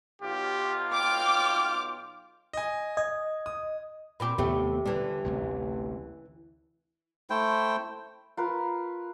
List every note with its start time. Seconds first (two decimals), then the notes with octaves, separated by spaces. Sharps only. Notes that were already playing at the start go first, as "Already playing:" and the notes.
0.22 B1 F4 G4
0.93 G5 D6 F6
2.53 D#5 G#5
2.97 D#5 G#6
3.46 D#6
4.20 A#2 C4 G4 B5 D6
4.38 D#2 C3 A3 B3 C4 G4 E5 G5
4.86 D3 E3 G3 D4
5.24 A1 D2 C3
7.30 A3 E4 C5 G5
8.37 F4 A#4 B4